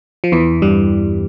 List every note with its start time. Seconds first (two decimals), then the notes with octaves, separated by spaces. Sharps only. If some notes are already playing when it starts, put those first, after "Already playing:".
0.24 F3
0.32 E2 E3
0.62 G2 G3